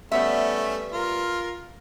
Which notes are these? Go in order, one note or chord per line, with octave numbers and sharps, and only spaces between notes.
G3 A3 B3 C#4 E5
F4 A#4